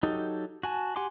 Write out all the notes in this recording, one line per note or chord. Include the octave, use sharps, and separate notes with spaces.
F#3 D#4 G4 A4
F#4 G#5 A5
G4 F#5 G#5 C6 D6